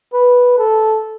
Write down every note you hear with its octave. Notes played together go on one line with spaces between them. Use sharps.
B4
A4